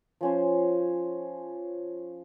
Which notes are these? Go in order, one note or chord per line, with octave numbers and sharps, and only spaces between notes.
F3 C#4 C5